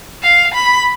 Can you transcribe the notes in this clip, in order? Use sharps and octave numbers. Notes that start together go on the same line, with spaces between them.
F5
B5